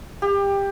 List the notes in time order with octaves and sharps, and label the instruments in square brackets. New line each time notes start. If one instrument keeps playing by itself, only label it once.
[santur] G4